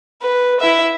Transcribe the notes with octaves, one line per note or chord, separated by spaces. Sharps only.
B4
E4 E5